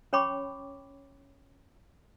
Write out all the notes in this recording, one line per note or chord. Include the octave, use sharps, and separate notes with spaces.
C#4 C#5 G5 B5 C#6 D6